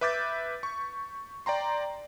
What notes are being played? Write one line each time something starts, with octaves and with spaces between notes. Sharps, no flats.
B4 E5 D6 G6 A6 B6
C#6
D5 G5 A#5 C6